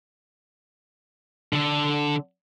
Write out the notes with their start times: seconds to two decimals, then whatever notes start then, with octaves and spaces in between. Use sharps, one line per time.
1.53 D3 A4